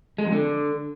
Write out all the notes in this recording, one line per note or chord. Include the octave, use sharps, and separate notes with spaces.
G#3
F2
D3